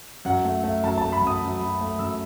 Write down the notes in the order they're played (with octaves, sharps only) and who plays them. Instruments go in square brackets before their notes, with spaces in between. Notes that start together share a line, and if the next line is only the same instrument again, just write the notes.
[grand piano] F#2 F#5
A3
A3
F#2 A5
A5
A3
B5
F#2
D#6
F#2
F#2
A3
F#2 E6